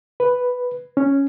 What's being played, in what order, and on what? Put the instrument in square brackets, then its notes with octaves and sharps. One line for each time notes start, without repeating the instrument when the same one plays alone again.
[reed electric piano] B4
C#4